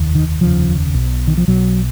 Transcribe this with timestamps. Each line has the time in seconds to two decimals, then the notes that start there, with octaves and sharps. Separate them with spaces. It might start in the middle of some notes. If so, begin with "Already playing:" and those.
Already playing: F1 D#2
0.15 D#3
0.41 F1 D#2 C#3 F3
0.94 B1 B2
1.27 D#3
1.37 F3
1.48 B1 B2 F#3